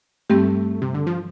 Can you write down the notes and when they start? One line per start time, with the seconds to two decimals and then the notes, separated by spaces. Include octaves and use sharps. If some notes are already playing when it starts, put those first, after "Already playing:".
0.30 G2 G3 A3 C4 G4
0.82 C3
0.94 D3
1.07 F3